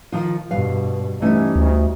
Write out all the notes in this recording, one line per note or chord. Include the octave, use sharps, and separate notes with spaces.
D#3 F3 F4
G2 B2 B4 F5
E3 G3 A3 C#4 D#4
D2